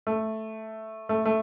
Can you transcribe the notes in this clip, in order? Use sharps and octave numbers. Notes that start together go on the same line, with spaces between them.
A3
A3
A3